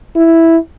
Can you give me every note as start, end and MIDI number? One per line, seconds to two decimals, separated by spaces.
0.16 0.57 64